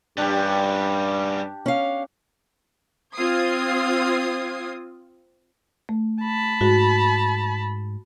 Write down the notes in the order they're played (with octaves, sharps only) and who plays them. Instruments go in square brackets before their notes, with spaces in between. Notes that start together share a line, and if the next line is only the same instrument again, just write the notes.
[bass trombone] G2 [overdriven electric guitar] G3 C#4 [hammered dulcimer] D4 G4
[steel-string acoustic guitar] C#4 F5
[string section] C4 F4 D#6 G#6 C7
[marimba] A3
[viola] A5 B5
[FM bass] G#2 [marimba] F#4